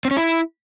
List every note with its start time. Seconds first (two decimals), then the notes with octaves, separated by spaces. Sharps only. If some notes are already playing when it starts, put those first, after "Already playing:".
0.05 C4
0.11 C#4
0.17 E4